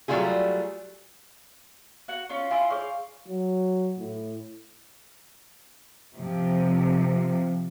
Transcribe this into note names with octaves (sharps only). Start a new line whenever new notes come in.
F#3 G3 A3 F4 G#4
F#4 F#5
C#4 F4 C#6
E4 F4 F5 G#5 C6
G#4 C#5 F5 C#6
F#3
A2
C3 F3